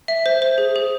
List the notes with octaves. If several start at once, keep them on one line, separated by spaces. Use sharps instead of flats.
E5
C5
C5
G#4
G#4